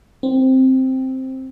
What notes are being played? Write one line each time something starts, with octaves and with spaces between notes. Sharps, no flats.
C4